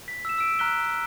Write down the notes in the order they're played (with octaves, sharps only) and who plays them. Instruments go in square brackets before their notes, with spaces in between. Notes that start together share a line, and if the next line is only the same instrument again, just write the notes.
[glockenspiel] B6
E6 E7
E6 D7
A#5 F6 F#6 B6 G7